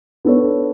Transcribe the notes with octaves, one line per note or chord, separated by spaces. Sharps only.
B3 D4 A4 C#5